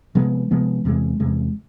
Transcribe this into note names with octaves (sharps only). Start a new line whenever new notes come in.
C3 F3 G#3 B3
C3 F3 G#3 B3
E2 C3 G#3
E2 C3 G#3